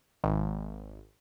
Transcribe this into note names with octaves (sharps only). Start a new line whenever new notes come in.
G#1